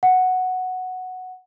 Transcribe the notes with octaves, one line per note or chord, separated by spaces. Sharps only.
F#5